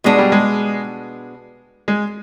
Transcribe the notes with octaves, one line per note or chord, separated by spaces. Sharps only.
B2 G#3 B3 D4 G#4
G3
G#3
G#3